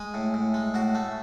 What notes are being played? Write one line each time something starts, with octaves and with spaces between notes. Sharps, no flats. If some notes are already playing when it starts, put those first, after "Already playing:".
Already playing: G#3 G#4
A2
A2
G#3
A2 F#4
A3